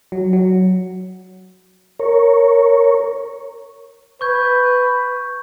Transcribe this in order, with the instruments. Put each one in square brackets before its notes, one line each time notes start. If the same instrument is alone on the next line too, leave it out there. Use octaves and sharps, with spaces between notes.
[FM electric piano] F#3
F#3
[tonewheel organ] A#4 C#5
[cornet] B4 [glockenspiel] C#6 G6 G#6